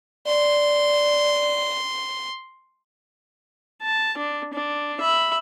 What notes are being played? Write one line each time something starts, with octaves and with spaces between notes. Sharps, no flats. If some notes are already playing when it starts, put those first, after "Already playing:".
D5 C6
A5
D4
D4
E5 B5